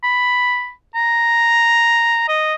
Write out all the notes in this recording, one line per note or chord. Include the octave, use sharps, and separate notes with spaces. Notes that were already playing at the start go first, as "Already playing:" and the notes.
B5
A#5
D#5